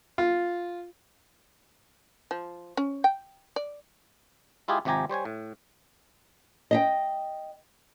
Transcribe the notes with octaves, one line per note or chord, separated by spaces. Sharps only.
F4
F3
C#4
G5
D5
G#3 E4 F4 G4 G#4
G#1 C3 F3 G4 G#5 A#5
G3 C5 C#5 G#5
A2
D#5 E5 G5